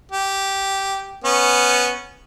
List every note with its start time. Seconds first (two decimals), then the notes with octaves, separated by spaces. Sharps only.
0.11 G4
1.24 B3 C#4